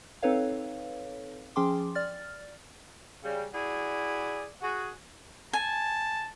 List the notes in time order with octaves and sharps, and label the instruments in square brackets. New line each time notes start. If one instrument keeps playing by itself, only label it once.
[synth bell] C4 D#4 A4 B4 C#5 F5
F3 C#4 G#4 G5 C6 D6
D5 F6 A6
[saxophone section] C#3 G3
E4 F#4 G#4 D5
F#4 G#4
[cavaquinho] G#5 [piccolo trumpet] A5